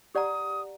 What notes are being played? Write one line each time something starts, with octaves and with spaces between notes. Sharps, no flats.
G4 D5 F#5 A#5 D#6